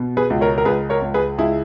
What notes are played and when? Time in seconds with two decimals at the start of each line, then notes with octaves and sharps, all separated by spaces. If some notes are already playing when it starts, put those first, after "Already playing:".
Already playing: B2
0.17 G#4 B4
0.30 C#2
0.41 A#4 C#5
0.58 A#4
0.65 C#2 G#4 B4
0.90 A#4 C#5
1.02 C#2
1.14 G#4 B4
1.38 C#2 E4 G#4